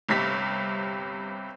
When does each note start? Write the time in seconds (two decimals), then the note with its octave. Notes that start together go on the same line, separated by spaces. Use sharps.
0.09 G1 G2 C3 B6